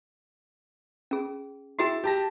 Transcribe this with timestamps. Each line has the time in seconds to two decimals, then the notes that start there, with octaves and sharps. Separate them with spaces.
1.11 C#4 G#4
1.79 E4 F#4 G#4 G5 A6 E7
2.04 G4 A5 A#6